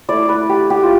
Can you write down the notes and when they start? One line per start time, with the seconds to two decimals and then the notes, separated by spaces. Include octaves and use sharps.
0.09 A3 E4 D5
0.29 B4
0.49 G4
0.70 G4
0.83 F4